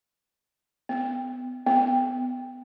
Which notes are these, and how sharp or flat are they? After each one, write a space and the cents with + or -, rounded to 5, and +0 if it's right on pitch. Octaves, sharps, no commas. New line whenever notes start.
B3 +25
B3 +20